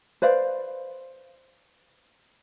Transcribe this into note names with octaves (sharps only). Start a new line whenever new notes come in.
B4 C5 D5 F5